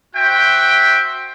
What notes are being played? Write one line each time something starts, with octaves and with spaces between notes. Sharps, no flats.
F#4 C5 E5 G5